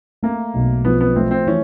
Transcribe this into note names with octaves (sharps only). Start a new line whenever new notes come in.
A3 A#3
B1
F3 B3
B3
A3 C4
C4
E3 C#4